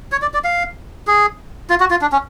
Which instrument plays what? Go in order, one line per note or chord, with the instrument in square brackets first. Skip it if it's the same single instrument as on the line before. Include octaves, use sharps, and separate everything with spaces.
[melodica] C#5
D5
D5
F5
G#4
F4
F#4
F4
D4
C#4